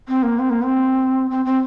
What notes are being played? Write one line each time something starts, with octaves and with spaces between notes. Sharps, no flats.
C4
A#3
C4
A#3
C4
C4
C4